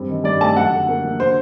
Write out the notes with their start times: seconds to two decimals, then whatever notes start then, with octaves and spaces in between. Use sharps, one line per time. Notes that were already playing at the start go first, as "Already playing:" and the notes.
Already playing: G2 C4
0.09 D#3
0.24 G2 D5
0.41 A3 A5
0.56 F#2 F#5
0.72 D3
0.89 A#3
1.04 F#3
1.20 D3 C5